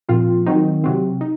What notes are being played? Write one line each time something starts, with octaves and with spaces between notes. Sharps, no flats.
A#2 F3 C4 F4
D#3 F#3 C4 D#4
C3 F#3 C4
D#4